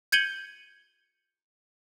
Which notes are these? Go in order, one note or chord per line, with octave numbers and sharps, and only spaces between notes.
G6 G#6 C#7 D#7 F#7 G7